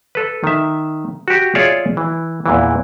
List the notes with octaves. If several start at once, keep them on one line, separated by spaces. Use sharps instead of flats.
A4 B4
D#3 E5
F#4 G4
F4 G#4 C#5 D5 E5
E3
E2 A#2 E3